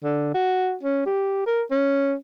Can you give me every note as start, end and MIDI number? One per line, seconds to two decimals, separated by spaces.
0.04 0.34 50
0.34 0.75 66
0.83 1.06 61
1.06 1.42 67
1.47 1.63 70
1.71 2.15 61